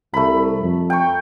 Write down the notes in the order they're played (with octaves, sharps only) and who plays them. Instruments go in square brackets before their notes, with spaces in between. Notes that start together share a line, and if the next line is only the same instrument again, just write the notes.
[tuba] C2 [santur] A3 B5
[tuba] F2
[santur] G5 C#6